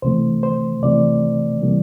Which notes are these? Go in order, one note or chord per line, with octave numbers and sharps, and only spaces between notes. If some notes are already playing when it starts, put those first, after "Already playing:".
C2 C3 E3 A3 C5
C5
C2 C3 E3 A3 D5
C3 E3 G3 A#3